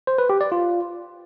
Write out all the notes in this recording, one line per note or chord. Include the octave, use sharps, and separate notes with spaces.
C5
B4
G4
D5
F4